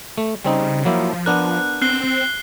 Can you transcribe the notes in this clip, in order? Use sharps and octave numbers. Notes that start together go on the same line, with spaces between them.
A3
C#3 G3 C4 D#4
F3 F#3 A#3 E4
B3 D4 A#4 F#6
C4 F#6 C7 G7